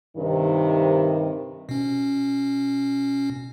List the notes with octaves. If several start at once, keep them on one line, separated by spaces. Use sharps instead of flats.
G2 C3 D#3
B2 C#4